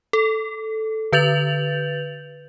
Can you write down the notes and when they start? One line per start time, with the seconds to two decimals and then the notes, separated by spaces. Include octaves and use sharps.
0.13 A4
1.12 D3 B4 G6 A6 F7 F#7